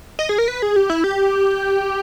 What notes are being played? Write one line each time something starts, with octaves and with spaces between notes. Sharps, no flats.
D#5
G#4
A#4
B4
G#4
G4
E4
G4